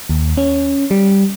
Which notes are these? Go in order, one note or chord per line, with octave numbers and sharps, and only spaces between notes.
D#2
C#4
G3